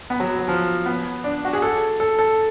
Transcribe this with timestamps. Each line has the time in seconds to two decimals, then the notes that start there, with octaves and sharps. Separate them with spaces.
0.10 B3
0.20 F#3
0.39 F#3
0.48 F3
0.86 B3
1.24 D4
1.45 F#4
1.53 G#4
1.62 A4
2.00 A4
2.19 A4